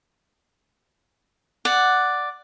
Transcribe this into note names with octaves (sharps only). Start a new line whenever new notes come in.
D5 F#5